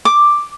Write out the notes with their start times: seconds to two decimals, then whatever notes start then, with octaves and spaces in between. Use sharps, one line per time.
0.05 D6